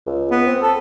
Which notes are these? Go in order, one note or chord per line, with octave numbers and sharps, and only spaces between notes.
C#2
B3
C4
A4